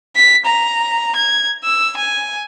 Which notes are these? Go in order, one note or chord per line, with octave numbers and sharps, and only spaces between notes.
B6
A#5
G#6
E6
G#5